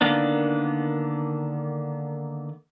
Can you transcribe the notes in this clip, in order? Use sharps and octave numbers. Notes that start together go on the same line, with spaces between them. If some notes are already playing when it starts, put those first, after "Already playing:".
D3 D#3 A#3 B3 D4